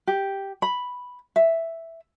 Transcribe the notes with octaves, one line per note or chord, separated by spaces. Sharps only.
G4
B5
E5